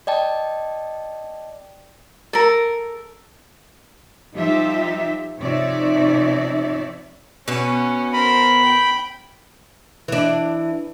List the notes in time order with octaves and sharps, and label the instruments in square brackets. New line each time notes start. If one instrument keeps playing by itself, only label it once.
[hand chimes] D5 D#5 G5 A5
[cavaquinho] A4 A#4
[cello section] F3 G3 D#4 F4 G4 E5
C3 F3 D#4 C#5 D5 E5
[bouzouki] B2 B3 [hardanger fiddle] C#4
[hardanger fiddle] A#4 C5 [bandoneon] B5
[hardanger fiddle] G5
[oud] E3 D4